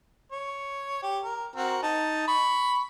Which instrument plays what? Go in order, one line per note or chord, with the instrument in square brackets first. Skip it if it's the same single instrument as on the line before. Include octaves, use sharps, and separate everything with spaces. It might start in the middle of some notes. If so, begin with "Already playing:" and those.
[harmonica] C#5
G4
A#4
C4 F#4 A#4
D#4 A5
B5 C#6